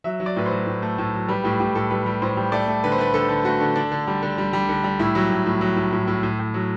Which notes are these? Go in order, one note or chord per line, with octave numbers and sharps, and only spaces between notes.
F#3 E5
F#3
D5
A2 B4
C5
F#3
A2
A3
A2
F#3
G3 B4
A2 G4
A2 G4
A2 A4
G3 B4
G3
A2 C5
G3
A3 D5
A3
D3 B4
C5
A3 B4
D3 A4
D3
A3 F#4
D3
D3 D4
D3
G3
D3
G3
G3
D3
G3
A2 E4
F#3
A2
A2
F#3
A2
A2
A2
A2
A2
F#3